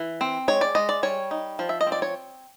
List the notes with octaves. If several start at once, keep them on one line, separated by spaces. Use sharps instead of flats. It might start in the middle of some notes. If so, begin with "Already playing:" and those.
Already playing: E3
C4
G#3 C#5
D5
G#3 D#5
D5
G3 C#5
D#4
F3
E5
D#5
C4
D5
C#5